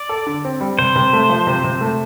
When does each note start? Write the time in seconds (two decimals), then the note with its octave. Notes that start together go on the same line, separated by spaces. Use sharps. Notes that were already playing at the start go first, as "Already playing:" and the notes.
Already playing: D5
0.09 A4
0.26 D3
0.45 C4
0.61 G3
0.78 C3 C5
0.96 C3
1.13 A3
1.29 F3
1.47 C3
1.64 C3
1.81 A3